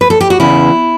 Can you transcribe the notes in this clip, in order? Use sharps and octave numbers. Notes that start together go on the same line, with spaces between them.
B4
A4
G4
F#4
E2 C#3 E3 E4